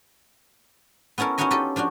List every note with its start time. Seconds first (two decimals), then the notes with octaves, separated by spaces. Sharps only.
1.18 B3 C#4 E4 A4 A#4
1.38 C#4 D#4 E4 F#4 C#5 D#5
1.51 D#4 F4 G4 A4 D#5
1.76 F3 D4 F4 F#4